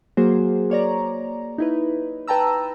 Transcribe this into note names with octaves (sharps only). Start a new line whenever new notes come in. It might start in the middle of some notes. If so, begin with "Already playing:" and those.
F#3 A#3 F#4 G#4 C5
A#3 C#5 D5 A#5
D#4 E4 B4
B4 G5 A5 A#5 E6